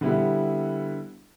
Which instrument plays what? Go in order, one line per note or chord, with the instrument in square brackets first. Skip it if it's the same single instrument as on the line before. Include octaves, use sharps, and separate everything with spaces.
[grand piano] D3 G3 B3 E4